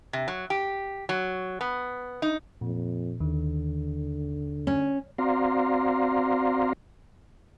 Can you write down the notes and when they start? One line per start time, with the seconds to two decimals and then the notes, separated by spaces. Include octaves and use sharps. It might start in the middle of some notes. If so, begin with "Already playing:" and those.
0.13 C3
0.28 F#3
0.50 G4
1.09 F#3
1.61 B3
2.22 D#4
2.61 F2 A#2
3.20 D#2 D3 D#3
4.67 C#4
5.18 C4 F#4 D5 F5 A#5 C6